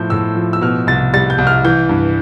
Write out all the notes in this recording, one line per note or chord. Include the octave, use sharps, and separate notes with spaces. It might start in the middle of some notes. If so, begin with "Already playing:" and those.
Already playing: A2 F3 G6
A2 E6
F3
E6
B2 F6
C2 A6
G3 A6
G6
C2
F6
E3 G6
G2